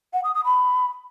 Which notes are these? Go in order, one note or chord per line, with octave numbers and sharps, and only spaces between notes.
F#5
D#6
D#6
B5